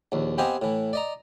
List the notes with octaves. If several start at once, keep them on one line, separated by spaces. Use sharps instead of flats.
A#1 D#2
B3 C4 G4 D#5 F5 G#5
A2 E3
D5 D#5 A#5